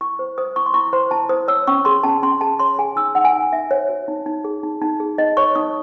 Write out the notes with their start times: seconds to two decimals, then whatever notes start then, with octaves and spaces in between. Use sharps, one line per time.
0.01 E4 C#6
0.19 C5
0.38 C5 D#6
0.56 E4 C#6
0.66 C6
0.74 E4 C#6
0.93 C5 C6
1.11 E4 A5
1.29 C5 D#6
1.48 C#5 E6
1.67 C#4 C#6
1.85 G#4 C6
2.03 C#4 A5
2.22 C#4 C6
2.41 G#4 A5
2.59 C#5 C6
2.79 G#4 G#5
2.96 D#4 E6
3.15 D#4 F#5
3.25 G#5
3.33 D#4 F#5
3.53 D#4 E5
3.71 C5 C#5
3.89 F#4
4.08 D#4
4.26 D#4
4.44 G#4
4.63 D#4
4.82 D#4
5.00 G#4
5.18 D#4 D#5
5.37 C#5 C#6
5.55 D#4 D#6